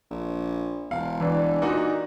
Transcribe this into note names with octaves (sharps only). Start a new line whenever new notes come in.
A#1
E1 F5
E3 D4
A#2 D#4 F#4 D5